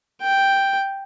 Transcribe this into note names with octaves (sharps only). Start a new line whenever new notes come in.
G5